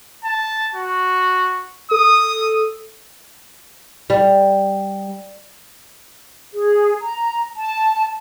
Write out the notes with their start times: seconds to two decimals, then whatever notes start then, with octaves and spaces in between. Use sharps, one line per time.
0.25 A5
0.75 F#4
1.91 A4 D#6
4.10 G3
6.53 G#4
7.01 A#5
7.57 A5